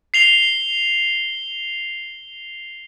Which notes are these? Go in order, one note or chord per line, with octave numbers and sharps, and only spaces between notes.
C7 F7 G7